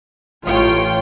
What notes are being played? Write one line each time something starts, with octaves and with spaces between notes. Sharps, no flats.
A1 F4 C#5 G5